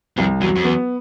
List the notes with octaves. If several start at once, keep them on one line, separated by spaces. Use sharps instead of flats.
C2 F2
E2 F#3
F2
E2 B3